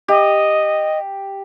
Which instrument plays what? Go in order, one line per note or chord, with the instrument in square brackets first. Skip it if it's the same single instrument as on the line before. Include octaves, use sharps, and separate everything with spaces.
[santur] G4 [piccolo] D#5